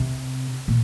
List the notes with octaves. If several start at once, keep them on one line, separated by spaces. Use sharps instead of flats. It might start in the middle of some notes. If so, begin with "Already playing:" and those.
Already playing: C3
A#2